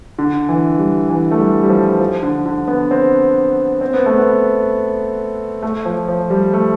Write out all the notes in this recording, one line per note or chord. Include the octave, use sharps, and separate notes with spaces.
D3
E3
G3
E3
A3
G3
G3
F3
F3
D3
D3
B3
C4
C4
B3
A3
B3
A3
F3
F3
G3
A3